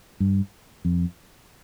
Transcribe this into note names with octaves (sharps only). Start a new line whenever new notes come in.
G2
F2